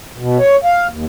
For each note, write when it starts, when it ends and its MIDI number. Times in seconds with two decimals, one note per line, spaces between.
0.18 0.38 47
0.38 0.56 73
0.64 0.87 77
0.89 1.05 39